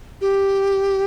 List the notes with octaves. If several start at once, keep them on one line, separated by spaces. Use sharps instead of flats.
G4